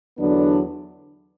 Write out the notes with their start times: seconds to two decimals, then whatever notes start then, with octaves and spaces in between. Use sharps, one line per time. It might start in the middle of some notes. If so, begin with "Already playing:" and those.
0.18 E2 D3 F#3 B3 D4